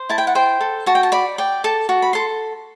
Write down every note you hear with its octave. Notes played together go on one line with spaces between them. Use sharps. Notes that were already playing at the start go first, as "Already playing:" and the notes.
Already playing: C5
E4 A5
G5
F#5
C5 G5
A4
F#4 A5
G5
A5
D5 B5
D5 G5
A4 A5
F#4
B5
A4 C6